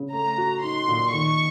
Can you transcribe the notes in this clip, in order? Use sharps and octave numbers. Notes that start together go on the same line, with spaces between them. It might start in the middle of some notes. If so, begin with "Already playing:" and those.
Already playing: C#3
A3 A#5
F#4
D#4 C6
A#2
D#3 C#6